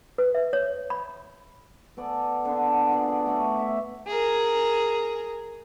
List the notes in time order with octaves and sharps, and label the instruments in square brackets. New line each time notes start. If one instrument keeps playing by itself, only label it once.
[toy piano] B4
E5
C#5
B5
[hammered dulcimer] B3 A4 D5 G#5
D3 A#3 B3 D4
F4 G#4 D5 A5
A3 F#4 C#5 D5
E5 B5
[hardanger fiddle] G#4 A#4